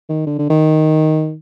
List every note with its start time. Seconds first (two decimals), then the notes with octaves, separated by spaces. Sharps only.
0.09 D#3
0.27 D3
0.38 D3
0.50 D#3